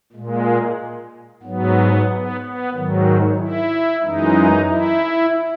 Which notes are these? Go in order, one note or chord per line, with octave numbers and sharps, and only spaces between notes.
A#2 G#3
G#2 F#3 B3
B3
B3
G#2 D#3 F#3
E4
F#2 E3 G#3 D#4
E4